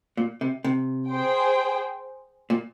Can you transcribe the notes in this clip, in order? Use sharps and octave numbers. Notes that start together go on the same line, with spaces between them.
A#2
C3
C3
G#4 C5 G5
A#2